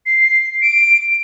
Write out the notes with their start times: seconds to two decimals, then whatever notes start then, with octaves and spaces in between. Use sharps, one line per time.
0.06 C7
0.62 D7